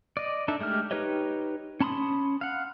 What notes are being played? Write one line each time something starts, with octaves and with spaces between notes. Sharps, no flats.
D5 D#5
D4 D#4 A4 E5
G#3 A3 G4 F6
D#4 G4 B4 C#5 D#5
C#4 A5 B5 C6 D#6
F5 F#5